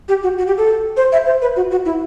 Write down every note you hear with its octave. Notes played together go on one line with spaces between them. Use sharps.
G4
F#4
F#4
G4
A4
C5
E5
C5
B4
F#4
F#4
E4